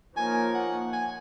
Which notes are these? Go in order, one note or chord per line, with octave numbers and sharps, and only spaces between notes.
F3 A#3 D#4 A#4 C#5 G#5
F#5
G#5